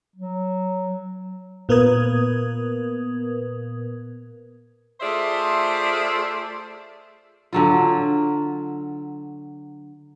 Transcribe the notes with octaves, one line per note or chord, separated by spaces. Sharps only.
F#3
A#2 B3 A#4 B4 D#6 G#6
A3 F4 G#4 C5 D5 E5
D3 F#3 F4